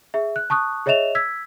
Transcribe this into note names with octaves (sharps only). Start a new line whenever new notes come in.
G#4 E5
F#6
A5 C#6 D#6 F#6
G#4 C#5 D#5 E5 E7 F7
E6 G#6 B6